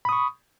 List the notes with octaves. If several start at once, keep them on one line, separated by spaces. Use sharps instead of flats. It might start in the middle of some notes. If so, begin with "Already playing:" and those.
B5 C#6 D#6